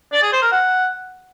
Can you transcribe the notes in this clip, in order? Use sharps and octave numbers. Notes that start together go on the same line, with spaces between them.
D5
G#4
C5
A#4
F#5